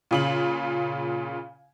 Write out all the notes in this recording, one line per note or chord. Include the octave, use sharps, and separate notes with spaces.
A#2 C#3 F#7